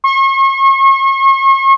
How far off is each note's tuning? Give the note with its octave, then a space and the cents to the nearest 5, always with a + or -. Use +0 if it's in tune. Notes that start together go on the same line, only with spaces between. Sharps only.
C#6 -40